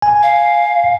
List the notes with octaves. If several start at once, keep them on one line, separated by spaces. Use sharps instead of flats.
G#5
F5